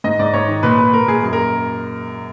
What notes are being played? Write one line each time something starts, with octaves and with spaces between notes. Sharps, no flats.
G#2 D#5
G#2 D5
G#2 C#5
D#3
A#2 B4
A#2 B4
A#2 A#4
A#2 G#4
F#2
A#4